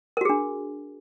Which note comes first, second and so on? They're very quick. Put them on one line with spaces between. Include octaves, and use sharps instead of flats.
A#4 F#4 G#4 D4